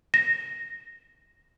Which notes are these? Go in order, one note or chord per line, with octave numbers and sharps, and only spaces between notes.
A#6